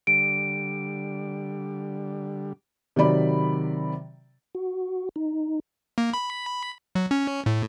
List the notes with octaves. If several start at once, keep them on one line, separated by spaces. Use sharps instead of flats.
D3 G3 D7
C3 D#3 F#3 D5 B5
F#4
D#4
A#3
B5
F#3
C#4
A2